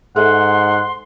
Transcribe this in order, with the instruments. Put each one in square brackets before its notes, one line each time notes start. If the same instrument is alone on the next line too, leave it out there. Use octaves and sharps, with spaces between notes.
[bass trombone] G#2 [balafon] G#4 A4 E5 [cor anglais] F#5 [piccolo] C6